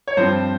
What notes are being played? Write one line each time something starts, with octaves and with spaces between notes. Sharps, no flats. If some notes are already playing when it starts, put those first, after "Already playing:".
C#5
G2 F3 C4 C5